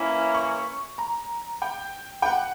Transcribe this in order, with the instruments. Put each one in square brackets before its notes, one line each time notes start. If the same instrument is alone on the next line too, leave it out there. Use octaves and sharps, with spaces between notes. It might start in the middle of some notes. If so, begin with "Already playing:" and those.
Already playing: [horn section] E3 A#3 C#4 E4
[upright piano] C#6
A#5
G5
G5
F#5